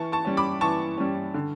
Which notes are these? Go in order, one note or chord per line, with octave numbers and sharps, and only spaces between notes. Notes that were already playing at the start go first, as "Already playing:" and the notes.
Already playing: E3 A5 C#6
A5 C#6
G3 C#4
B5 D6
E3 A5 C#6
G3 C#4
D3